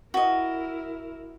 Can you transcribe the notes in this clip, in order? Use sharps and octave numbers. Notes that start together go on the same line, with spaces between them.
E4 F#4 A#4 D#5